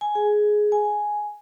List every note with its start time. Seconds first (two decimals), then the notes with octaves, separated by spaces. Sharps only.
0.01 G#5
0.15 G#4
0.72 G#5